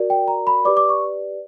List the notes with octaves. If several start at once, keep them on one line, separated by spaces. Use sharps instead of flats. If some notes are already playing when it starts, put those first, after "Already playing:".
Already playing: F#4 A#4 D5
G5
A#5
B5
G4 B4 D5 D6
D6
C#6